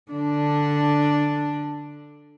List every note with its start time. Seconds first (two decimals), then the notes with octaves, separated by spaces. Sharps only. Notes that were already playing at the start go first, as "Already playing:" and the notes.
0.12 D3 D4